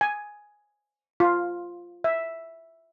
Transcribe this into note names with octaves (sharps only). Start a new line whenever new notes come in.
G#5
F4
E5